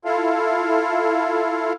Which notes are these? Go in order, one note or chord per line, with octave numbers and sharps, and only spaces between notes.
E4 F4 A4 F5